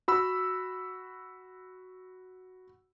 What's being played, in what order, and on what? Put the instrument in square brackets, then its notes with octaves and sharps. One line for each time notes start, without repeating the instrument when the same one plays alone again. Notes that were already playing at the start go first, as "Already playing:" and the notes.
[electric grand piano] F#4 B5 E6